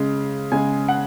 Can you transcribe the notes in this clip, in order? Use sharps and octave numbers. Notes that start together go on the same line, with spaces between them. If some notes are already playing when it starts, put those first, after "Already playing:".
Already playing: C#3 G#3
C#3 G#3 G#5
F#5